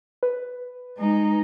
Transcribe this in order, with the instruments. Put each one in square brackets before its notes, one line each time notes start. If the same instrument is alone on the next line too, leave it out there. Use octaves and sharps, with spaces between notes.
[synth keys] B4
[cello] G#3 D#4